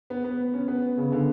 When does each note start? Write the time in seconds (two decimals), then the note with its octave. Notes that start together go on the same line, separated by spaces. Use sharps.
0.10 B3
0.24 B3
0.54 C#4
0.68 B3
0.97 C#3
1.12 D3